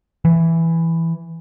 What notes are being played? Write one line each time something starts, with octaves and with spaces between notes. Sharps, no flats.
E3